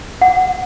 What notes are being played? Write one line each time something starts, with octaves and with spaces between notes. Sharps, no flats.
F#5